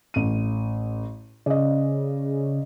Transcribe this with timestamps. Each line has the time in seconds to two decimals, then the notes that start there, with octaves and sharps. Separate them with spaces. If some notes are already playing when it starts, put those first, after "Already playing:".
0.14 A1 D#7
1.46 C#3 D5 D#5